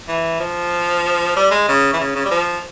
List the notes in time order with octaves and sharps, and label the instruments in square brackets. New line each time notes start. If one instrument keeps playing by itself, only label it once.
[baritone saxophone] E3
F3
G3
G#3
C#3
E3
C#3
C#3
G3
F3